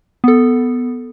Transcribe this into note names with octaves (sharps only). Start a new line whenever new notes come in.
B3 A4